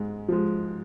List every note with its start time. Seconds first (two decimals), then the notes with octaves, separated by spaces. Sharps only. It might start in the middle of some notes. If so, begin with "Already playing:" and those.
Already playing: G#2 G#3
0.28 F3 G#3